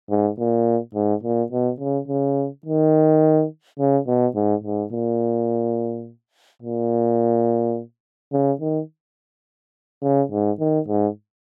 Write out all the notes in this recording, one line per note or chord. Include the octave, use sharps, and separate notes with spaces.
G#2
A#2
G#2
A#2
B2
C#3
C#3
D#3
C#3
B2
G#2
G#2
A#2
A#2
C#3
D#3
C#3
G#2
D#3
G#2